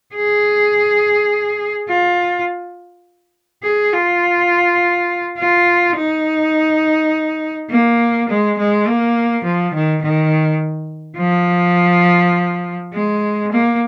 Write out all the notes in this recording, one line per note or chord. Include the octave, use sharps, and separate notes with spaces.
G#4
F4
G#4
F4
F4
D#4
A#3
G#3
G#3
A#3
F3
D#3
D#3
F3
G#3
A#3